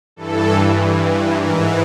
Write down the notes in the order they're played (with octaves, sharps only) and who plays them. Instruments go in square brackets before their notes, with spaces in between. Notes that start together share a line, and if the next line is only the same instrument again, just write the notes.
[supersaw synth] G2 E3 A4
G#2 E3 A#4